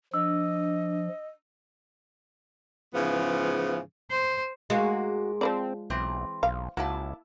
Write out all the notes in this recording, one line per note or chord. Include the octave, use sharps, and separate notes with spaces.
F3 D4 D#5 E6
G#2 C#3 E3 F3 B3
C5
G#2 G#3 A#3 F#4
F3 C4 C5 D5
B1 E3 C4
B1 F5
C#2 F#3 A#3 E4 A5